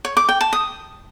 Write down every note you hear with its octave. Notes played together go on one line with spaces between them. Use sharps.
C#5
D6
G5
A5
D#6